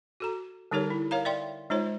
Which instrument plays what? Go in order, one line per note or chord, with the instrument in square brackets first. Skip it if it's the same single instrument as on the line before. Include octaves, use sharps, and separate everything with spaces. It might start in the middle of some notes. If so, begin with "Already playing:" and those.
[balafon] F#4 A4 A#5
D3 G3 D#4 G4 A#4 C#5
E4
A#4 C#5 F5 A#5
D5 E5 G5 C6
G#3 D#4 F4 C5 C#5